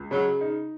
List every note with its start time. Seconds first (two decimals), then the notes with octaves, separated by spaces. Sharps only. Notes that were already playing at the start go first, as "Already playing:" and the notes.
Already playing: C#2
0.11 C#3 F#3
0.41 D#4